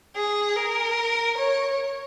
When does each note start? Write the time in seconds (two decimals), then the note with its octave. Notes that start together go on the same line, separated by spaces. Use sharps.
0.16 G#4
0.56 A#4
1.37 C#5